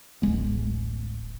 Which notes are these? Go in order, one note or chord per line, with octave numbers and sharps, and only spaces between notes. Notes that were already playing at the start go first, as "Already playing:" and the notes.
D1 A1 G#3 B3